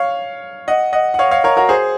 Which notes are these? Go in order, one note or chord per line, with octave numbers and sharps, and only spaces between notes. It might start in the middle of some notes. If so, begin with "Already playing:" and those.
Already playing: C#5 F5
D#5 F#5
D#5 F#5
F#5
C#5 F5
C#5 F5
A#4 C#5
F#4 A#4
G#4 C5